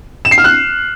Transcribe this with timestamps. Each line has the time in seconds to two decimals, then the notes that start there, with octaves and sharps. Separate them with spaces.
0.25 E7
0.31 C7
0.38 F6
0.44 F#6